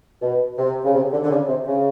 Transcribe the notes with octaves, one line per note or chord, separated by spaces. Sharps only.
B2
C3
C#3
C3
D3
D3
C#3
C3
C#3